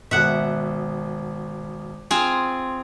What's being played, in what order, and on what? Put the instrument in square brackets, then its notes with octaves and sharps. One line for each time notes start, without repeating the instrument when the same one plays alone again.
[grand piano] G#1 B2 [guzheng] E5 F#5
[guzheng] C4 F4 G#4